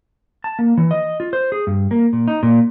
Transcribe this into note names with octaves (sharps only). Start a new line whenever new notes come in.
A5
A#3
E3
D#5
F4
C5
G#4
G2
A#3
A#2
D#4
A#2